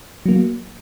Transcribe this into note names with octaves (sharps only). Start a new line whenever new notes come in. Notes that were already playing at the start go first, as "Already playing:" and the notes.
F#3 A#3